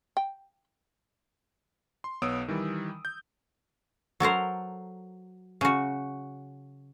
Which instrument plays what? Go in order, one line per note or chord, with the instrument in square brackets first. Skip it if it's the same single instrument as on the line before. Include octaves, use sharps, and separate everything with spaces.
[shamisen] G5
[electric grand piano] C6
B1 B3 C#5 D#6 E6 D7
D#3 E3 G3
G6
[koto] F#3 A4 A#4 C5
C#3 F#4